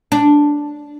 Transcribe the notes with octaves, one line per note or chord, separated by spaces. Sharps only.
D4